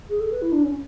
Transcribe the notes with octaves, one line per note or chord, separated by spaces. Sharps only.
G#4
A4
B4
E4
D4
C#4